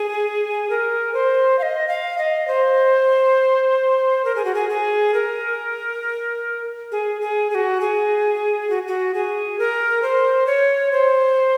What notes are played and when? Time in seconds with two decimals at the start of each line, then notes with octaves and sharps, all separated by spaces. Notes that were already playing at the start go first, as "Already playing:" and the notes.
Already playing: G#4
0.70 A#4
1.14 C5
1.59 F5
1.62 D#5
1.88 F5
2.18 D#5
2.47 C5
4.25 A#4
4.36 G#4
4.45 F#4
4.55 G#4
4.70 G#4
5.14 A#4
6.92 G#4
7.21 G#4
7.50 G#4
7.55 F#4
7.81 G#4
8.70 F#4
8.88 F#4
9.14 G#4
9.59 A#4
10.02 C5
10.46 C#5
10.92 C5